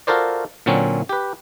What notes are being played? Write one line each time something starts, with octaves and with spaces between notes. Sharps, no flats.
F4 F#4 A4 A#4 C5 D5
A#2 D3 F#3 C4 C#4
G4 B4